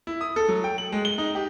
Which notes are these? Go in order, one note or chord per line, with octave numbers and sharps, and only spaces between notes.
E4
D#6
A4
F#3
G5
F#7
G#3
G7
D#4
G4